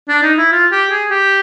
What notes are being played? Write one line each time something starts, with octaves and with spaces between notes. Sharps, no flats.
D4
D#4
E4
F4
G4
G#4
G4